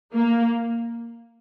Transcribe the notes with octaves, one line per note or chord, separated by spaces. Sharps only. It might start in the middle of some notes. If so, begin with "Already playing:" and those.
A#3